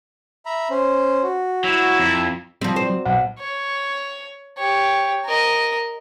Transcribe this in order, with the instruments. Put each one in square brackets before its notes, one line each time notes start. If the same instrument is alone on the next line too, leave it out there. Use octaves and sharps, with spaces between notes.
[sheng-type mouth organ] E5 A#5 B5
C#4 C5
F#4
[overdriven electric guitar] F#3 [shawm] E4
[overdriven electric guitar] F2 [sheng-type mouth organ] A#5
[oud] F3 G3 [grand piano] C4
[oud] C5
[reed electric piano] F#3
[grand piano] B1 [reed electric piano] F#5
[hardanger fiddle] C#5
G4 C#5
A#4 D#5